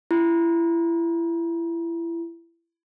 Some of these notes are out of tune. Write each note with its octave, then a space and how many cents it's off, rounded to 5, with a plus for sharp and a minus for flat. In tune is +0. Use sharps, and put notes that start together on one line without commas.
E4 +30